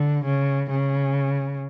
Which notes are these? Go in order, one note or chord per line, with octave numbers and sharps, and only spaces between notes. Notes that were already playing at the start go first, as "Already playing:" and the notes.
Already playing: D3
C#3
C#3